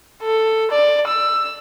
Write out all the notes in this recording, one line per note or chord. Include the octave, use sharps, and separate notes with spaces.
A4
D5
E6